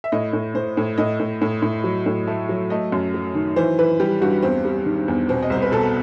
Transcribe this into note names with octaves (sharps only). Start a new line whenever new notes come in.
E5
A2 D#5
A2
A2 C5
A2
A2 D#5
A2
A2
A2
F#3
A2
A3
F#3
A3 D#5
F#2
F#3
D#3
E3 C5
E3 B4
G3 G4
G2 F#4
E2 C4
G3
D#3
E2
B2 C4
D#5
C2 C5
B4
B2 A4